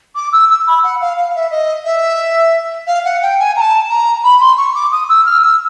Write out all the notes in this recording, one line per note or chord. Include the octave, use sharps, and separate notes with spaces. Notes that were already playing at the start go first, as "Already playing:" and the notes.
D6
E6
E6
B5
F#5
F5
F5
E5
D#5
E5
F5
F#5
G5
G#5
A#5
A5
A#5
B5
C6
C#6
D6
D#6
E6
F6
E6